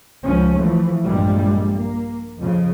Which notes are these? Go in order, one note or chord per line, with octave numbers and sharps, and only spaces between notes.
C#2 F3 C#4
E3 F3 A3
A#1 G2 A#2 G3 G#3
A#3
F2 C#3 F3